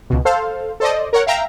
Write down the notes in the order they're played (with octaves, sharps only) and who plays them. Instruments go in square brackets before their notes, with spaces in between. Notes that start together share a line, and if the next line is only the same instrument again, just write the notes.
[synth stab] C#2 B2
A4 C5 F5
A4 C5 D5 D#5
A#4 C#5 F#5
E5 F5 G5 A#5